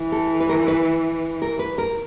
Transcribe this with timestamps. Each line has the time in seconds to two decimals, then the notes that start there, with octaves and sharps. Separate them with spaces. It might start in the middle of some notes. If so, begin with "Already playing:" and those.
Already playing: E3
0.12 A4
0.40 B4
0.49 A#4
0.68 B4
1.42 A#4
1.59 B4
1.78 A#4